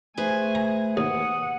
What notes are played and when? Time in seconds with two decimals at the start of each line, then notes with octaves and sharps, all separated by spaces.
0.17 A3 G#4 B4 C5 G#5
0.55 A#5
0.97 D#2 F#5 D#6